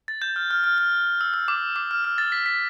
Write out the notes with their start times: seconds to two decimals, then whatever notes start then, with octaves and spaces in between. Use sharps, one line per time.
0.08 A6
0.22 G6
0.36 F6
0.51 F6
0.64 F6
0.78 F6
1.21 E6
1.34 E6
1.48 D6
1.76 D6
1.91 F6
2.04 F6
2.18 A6
2.32 B6
2.46 B6